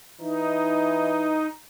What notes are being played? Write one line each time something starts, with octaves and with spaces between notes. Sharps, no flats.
E3 D#4